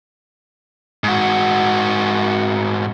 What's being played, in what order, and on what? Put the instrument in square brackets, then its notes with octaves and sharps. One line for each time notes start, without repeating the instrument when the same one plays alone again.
[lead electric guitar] G#2 F#4